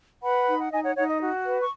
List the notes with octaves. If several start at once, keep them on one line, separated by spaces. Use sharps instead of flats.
B4 F#5 B5
D#4
F#5
D#4 D#5 G#5
C#5 F#5
D#4 C#5 F#5
D#5
F#4
B4
C#6